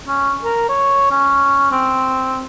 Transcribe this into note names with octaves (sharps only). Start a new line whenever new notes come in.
C#4
A#4
C#5
C#4
C4